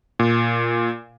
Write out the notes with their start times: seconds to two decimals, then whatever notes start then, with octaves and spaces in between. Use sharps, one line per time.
0.19 A#2